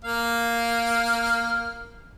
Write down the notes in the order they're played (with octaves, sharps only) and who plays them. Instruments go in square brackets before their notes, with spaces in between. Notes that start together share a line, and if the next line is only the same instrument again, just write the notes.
[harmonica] A#3 F5